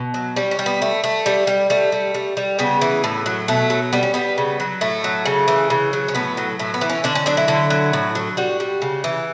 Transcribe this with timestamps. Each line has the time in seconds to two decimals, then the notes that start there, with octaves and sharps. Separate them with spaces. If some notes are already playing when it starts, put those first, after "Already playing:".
Already playing: B2
0.14 F#3
0.36 G3 C#4
0.51 C#4
0.59 G3
0.66 B3
0.82 A3
1.04 A3
1.26 G3
1.47 G3
1.70 G3 A3
1.92 G3
2.14 G3
2.37 G3
2.59 C#3 B3
2.81 E3
3.04 A2
3.26 F#3
3.48 B2 A3
3.70 F#3
3.93 G3 B3
4.03 C#4
4.14 G3 B3
4.38 C#3
4.60 F#3
4.81 A2 A3
5.04 F#3
5.25 C#3
5.48 E3
5.70 C#3
5.93 F#3
6.08 C#4
6.15 A2 B3
6.37 F#3
6.59 A2 A3
6.74 B3
6.81 E3
6.90 C#4
7.04 D3 D4
7.15 C#4
7.26 F#3 D4
7.37 E4
7.48 D3
7.70 F#3
7.93 A2
8.15 F#3
8.37 G3 F#4
8.60 G3
8.82 C#3
9.04 E3